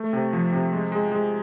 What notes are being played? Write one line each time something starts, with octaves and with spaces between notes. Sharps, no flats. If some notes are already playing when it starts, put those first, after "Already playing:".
Already playing: A3
C3
F3
C3
G#3
G#3
G#3